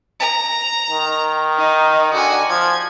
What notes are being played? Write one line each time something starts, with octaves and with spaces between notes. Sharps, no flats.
A#5
D#3
D#4
D3 F#4 G#5
F3 G#6